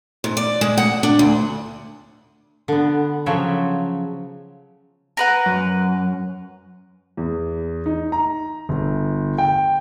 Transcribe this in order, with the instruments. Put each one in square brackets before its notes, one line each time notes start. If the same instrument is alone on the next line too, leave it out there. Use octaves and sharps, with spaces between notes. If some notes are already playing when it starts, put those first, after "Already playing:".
[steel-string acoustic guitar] G#2
D5
G#3
F#5
D4
D2
[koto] D3 B3
C#3 F3 F#3 C#5 E5 G5
[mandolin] A#4 B4 F#5
[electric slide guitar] F#2
[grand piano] E2
D#4
A#5
G1
G5